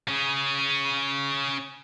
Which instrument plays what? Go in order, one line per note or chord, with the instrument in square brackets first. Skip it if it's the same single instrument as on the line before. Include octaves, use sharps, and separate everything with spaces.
[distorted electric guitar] C#4 G#4